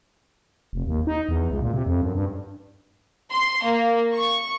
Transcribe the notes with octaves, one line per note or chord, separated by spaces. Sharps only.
F1
D#2
D#4
E2
C#2
A#2
C3
F2
F#2
G2
C6
A#3
C#6